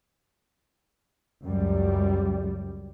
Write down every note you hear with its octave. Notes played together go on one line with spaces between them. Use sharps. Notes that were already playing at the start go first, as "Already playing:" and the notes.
C#2 F#2 G3